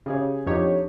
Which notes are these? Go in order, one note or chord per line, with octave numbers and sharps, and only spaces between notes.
C#3 G4 G#4 C#5
F2 D4 D#4 G4 C#5